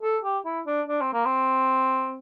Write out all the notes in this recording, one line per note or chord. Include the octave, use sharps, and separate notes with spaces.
A4
G4
E4
D4
D4
C4
A#3
C4